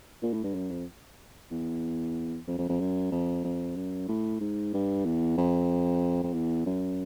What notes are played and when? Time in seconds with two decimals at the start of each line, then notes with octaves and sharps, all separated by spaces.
0.23 A#2
0.33 A2
0.44 G2
0.54 F#2
0.71 F2
1.51 E2
2.48 F2
2.58 F2
2.69 F2
2.80 F#2
3.11 F2
3.45 F2
3.76 F#2
4.08 A2
4.40 G#2
4.73 G2
5.05 E2
5.38 F2
6.23 F2
6.33 E2
6.66 F#2